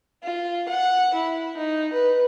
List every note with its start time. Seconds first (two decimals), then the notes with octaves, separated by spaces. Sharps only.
0.23 F4
0.69 F#5
1.14 E4
1.57 D#4
1.93 B4